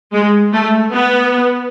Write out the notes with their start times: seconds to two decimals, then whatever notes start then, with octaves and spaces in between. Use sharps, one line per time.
0.13 G#3
0.53 A3
0.93 B3